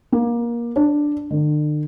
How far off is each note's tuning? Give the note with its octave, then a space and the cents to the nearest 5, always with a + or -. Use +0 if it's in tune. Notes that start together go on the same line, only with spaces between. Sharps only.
A#3 +20
D4 +5
D3 +40